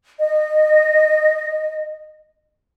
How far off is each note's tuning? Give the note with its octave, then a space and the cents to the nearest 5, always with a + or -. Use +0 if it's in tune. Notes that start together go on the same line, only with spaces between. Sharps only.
D#5 -20